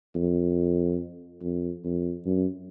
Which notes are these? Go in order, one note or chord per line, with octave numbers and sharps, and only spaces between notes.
F2
F2
F2
F#2